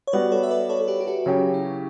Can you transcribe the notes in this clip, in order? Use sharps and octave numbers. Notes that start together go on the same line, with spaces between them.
C#5
G3 B3 F#4 B4 D5
A4 C#5
E5
B4 D5
A4 C#5
A4
G4 B4
G4
F#4 A4
C#3 F#3 C#4 F#4 G4
E4